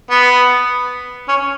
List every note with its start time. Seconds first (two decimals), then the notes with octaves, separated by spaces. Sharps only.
0.11 B3
1.28 C#4